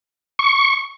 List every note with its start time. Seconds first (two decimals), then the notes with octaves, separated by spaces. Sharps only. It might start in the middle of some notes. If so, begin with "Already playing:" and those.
0.39 C#6